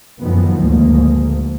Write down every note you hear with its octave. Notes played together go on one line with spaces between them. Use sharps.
F#2 A2 D#3 F3 B3
D2 G#2 A#3